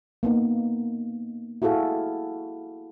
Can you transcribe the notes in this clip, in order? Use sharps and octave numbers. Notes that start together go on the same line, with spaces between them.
A#3 B3 D#4
E4 F#4 G#4 A4 F5